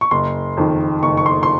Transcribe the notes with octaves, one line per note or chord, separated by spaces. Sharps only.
C#6
F#1 C6
F2 D#3
F#1 C#6
C#6
C6
C6